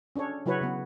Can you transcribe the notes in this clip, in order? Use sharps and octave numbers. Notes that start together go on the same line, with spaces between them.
C#4 D4 A4 C#5
C#3 F#3 E4 F#4 B4 C#5
C#3 B3